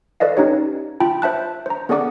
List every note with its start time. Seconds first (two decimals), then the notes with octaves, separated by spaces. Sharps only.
0.20 A4 B4 D5 D#5 F5
0.37 C#4 D#4 G4 C#5
1.00 F4 G5 A5 B5
1.22 C5 E5 A5 F#6
1.66 C5 A#5
1.89 B3 G#4 A4 D5 F#5 D6